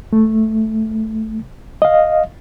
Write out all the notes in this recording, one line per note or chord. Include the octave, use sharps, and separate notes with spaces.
A3
D#5 F5